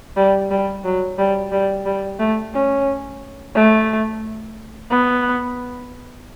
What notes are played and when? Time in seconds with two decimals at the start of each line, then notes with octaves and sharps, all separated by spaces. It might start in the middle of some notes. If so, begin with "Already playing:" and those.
0.17 G3
0.51 G3
0.84 F#3
1.18 G3
1.52 G3
1.86 G3
2.19 A3
2.54 C#4
3.55 A3
4.91 B3